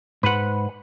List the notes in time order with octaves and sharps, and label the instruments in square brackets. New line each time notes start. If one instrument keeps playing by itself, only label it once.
[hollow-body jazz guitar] G#2 C5 [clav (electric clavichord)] B4 F#5